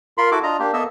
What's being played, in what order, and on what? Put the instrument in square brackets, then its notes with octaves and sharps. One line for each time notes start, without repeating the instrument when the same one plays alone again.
[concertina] F4 A#4 B5 C6
E4 F#4 A4 D6
D4 F4 D#5 A#5
A#3 D4 G4
A#3 B3 A4 D#5 E5 E6